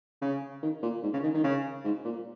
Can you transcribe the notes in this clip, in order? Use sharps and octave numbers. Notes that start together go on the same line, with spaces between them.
C#3
D#3
A#2
G#2
C#3
D#3
D#3
C#3
G#2
A#2